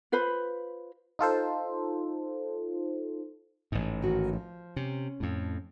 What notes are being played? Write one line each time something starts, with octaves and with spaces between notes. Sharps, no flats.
F4 B4 C5 B5
D#4 F4 A4 C5
A1 G#2
D#3 F#4
F3
C3 C#4
F2 A2